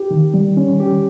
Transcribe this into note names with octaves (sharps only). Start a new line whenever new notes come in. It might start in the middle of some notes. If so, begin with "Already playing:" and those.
Already playing: G4
D#3
G3
C#4
G4